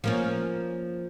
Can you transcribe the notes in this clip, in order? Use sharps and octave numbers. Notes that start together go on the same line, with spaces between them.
F3 A#3 C#4